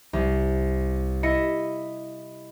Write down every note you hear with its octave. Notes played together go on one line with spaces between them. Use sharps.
C2
E4 D#5 C#7